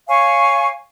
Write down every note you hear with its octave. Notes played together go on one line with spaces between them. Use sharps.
C#5 F5 G#5 C#6